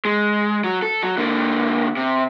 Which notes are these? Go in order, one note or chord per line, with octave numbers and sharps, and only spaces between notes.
G#3
F#3
A4
F#3
D3 A#3
C3